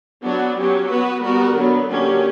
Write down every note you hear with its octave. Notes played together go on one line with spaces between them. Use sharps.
F#3 B3 D4 F#4
F#3 C#4 G4
B3 F#4 B4
G3 B3 F#4 A#4
D3 F#3 B3
D3 F#3 A#3 C#4 G4